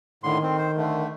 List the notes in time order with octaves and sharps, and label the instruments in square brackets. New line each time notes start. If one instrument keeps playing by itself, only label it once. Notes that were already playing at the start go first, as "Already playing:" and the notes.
[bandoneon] A2 D3 C6 [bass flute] D#3
[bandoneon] C4
C5
D3 A3